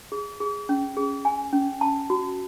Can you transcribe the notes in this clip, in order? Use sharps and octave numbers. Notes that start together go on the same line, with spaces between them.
G#4
G#4
C#4
G#4
G#5
C#4
A5
F#4